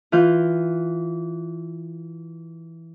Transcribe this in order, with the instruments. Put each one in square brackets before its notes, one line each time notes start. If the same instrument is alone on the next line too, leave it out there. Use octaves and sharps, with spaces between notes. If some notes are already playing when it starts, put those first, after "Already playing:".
[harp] E3 F4 F5 G6